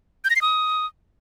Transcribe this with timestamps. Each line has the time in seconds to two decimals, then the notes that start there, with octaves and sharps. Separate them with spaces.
0.24 G6
0.30 A#6
0.36 C7
0.41 D#6